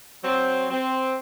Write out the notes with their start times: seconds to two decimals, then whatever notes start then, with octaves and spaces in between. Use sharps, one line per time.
0.24 F#3 C4
0.70 C4